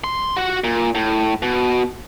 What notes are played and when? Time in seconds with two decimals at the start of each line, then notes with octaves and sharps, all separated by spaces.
0.04 C6
0.37 F#4 F#5
0.64 A#2
0.95 A2
1.43 B2